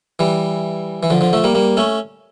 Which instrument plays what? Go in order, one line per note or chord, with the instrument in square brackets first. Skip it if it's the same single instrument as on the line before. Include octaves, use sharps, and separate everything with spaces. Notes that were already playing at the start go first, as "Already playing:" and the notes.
[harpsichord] E3 G3
E3
D3 F3
D3 F3
F3 A3
G3 A#3
G3 A#3
A3 C#4